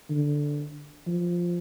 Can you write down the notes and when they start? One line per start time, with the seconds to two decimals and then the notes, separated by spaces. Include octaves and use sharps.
0.10 D3
1.07 F3